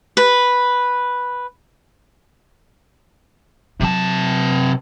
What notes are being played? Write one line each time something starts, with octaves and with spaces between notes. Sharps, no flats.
B4
C3 F#3 D#4 A5